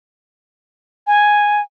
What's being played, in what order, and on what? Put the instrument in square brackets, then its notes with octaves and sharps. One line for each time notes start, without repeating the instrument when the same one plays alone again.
[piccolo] G#5